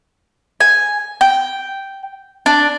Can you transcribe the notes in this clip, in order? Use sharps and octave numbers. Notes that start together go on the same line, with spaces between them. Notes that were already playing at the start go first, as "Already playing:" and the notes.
G#5
G5
D4